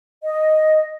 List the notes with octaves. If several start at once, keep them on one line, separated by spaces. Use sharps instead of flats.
D#5